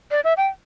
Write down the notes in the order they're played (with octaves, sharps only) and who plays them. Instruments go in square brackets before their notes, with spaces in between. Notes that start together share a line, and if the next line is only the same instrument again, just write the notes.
[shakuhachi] D5
E5
G5